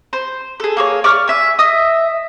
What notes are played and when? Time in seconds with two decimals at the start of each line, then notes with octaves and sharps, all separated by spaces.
0.13 C5
0.60 G#4 A4
0.77 A#3 G#4 C#5
1.04 D5 C#6 F6
1.28 E5 G#5
1.59 D#5 E5 D#6